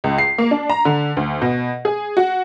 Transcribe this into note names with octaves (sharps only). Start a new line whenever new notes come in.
C#2
C7
A#3
D4
A#5
D3
D2
B2
G#4
F#4